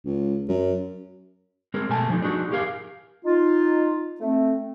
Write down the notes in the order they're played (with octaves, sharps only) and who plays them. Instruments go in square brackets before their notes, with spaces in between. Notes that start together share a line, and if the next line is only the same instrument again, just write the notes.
[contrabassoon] C#2
F#2
[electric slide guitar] G#3 C4 G#4 A#4
B2 A3 G#5 A5
F3 A3 D#4
D4 D#4 F#4 G#4
E4 G4 G#4 A#4 F5
[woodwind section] D#4 F4
A3 C4